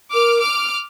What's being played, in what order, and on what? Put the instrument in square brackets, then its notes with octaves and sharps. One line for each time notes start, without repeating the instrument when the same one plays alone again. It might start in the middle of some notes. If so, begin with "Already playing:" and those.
[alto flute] A#4 [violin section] D6 F6
[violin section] D6 F6